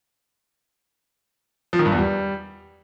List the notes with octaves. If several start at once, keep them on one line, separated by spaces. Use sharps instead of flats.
F3
D#3
G2
E2
G3